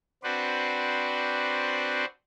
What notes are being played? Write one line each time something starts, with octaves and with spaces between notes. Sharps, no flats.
C4 D4 F#4 B4 C5 D5